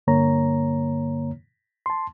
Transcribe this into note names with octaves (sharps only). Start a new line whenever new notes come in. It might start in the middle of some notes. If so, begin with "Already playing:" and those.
G2 D3 A#3 C#5 A#5
A5 C6